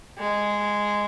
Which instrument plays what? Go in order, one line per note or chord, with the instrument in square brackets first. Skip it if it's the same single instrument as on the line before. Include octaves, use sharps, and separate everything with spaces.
[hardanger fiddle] G#3